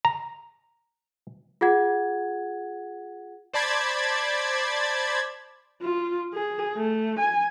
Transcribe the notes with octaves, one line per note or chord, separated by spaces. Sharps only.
A#5
F4 G#4 F#5 G#6
C5 D5 A5 B5 G#6 A6
F4
G#4
A3
G#5